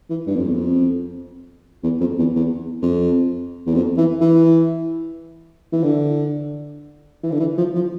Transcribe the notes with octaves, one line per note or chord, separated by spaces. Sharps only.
E3
G2
F2
E2
F2
E2
F2
E2
E2
F2
E2
F2
E3
E3
E3
D3
E3
D3
E3
F3
F3